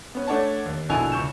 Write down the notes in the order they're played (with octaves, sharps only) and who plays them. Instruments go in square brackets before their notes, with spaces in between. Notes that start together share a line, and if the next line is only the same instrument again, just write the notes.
[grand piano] B3 C#4
A3 D4 C#5 F#5 A5
D#2
A#1 B2 D3 E4 G#5 F7
C#2 C#6 G6 E7